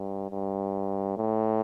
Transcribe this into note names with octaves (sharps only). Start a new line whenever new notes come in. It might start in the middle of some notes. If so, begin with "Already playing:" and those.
Already playing: G2
G2
A2